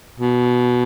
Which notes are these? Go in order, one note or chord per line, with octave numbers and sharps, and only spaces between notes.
B2